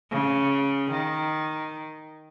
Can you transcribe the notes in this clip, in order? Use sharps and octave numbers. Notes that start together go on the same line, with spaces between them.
C#3
D#3